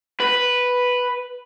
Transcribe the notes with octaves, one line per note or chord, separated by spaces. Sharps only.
B4